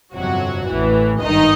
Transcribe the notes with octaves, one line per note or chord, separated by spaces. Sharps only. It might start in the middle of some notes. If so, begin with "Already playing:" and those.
G1 F2 C3 F#3 F#4
A1 A2 E3
G#1 G2 D#3 D#4 D#5